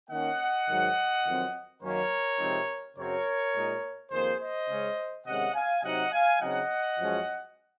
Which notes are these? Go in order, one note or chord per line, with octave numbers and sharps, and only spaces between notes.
D#3 A#3 C#4 D#5 F#5
G#2 D#3 F#3
F2 D#3 F#3 C4
F#2 D#3 F#3 A#3 C#4 A#4 C#5
C3 F3 G#3 C4 D#4
F#2 C#3 F#3 C4 A#4 C#5
A#2 G#3 D#4
F2 D#3 A#3 G#4 C5
C5 D#5
C#3 G#3 C#4
C3 D#3 G#3 C#4 D#5 F#5
F5 G#5
C3 F#3 C4 D#4 D#5 F#5
F5 G#5
C#3 F#3 C4 D#4 D#5 F#5
F#2 F3 G#3 C#4